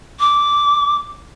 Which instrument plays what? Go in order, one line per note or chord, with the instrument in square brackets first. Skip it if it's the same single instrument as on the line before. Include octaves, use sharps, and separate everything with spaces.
[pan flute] D6